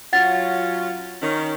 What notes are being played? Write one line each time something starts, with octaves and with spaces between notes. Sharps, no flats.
F#3 C#4 F4 F#5 A6
D#3 C#4